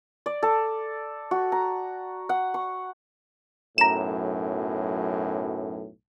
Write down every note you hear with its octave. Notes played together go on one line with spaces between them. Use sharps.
D5
A4
F#4
A#5
F#5
C#6
B1 F#2 A2 A#5 E7